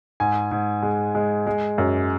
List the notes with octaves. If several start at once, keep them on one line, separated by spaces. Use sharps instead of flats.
G#2 G#5
G#2
G#3
G#3
G#3
F#2